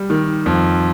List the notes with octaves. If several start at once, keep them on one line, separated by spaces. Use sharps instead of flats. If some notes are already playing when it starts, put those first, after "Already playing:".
Already playing: G3
D#3
F2